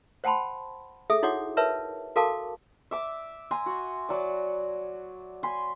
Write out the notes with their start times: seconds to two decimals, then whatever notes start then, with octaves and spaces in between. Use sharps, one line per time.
0.24 C5 F#5 G5 A5 B5 C6
1.10 G#4 A4 E5 D#6
1.23 D#4 E4 F#4 C#5 F#5 D6
1.57 A#4 B4 C#5 E5 A5
2.16 F#4 A4 A#4 F5 A5 D6
2.91 E5 D6
3.51 G#5 A#5 C6
3.66 F#4
4.09 F#3 D5
5.43 G#5 B5 C6